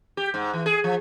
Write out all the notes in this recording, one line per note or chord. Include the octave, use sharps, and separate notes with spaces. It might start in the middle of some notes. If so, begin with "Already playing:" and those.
G4
G#2
E3
G#4
F3